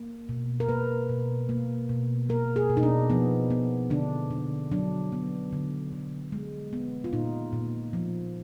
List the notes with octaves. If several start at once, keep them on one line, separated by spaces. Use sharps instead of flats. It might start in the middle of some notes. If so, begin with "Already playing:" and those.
Already playing: A#3
B2
A#4
A#3 B4
B2
A#3
B2
A#3 A#4
G#4
B2
D#4
D4
F3 B3
B3
D3 D4
D3
F#3 D4
B3
D3
D3
G#3
B3
F4
A#2 D#4
A#2
F3